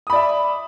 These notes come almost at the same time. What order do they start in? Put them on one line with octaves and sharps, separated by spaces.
D#6 B5 D5 E5